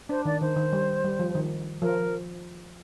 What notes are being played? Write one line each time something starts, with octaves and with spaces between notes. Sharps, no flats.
D4 C5
D#3 D5
D#3 C5
D#3
G3
G3
F3
D#3
F3 A#4